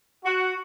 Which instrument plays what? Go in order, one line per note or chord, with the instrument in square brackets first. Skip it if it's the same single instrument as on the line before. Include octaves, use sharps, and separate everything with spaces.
[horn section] F#4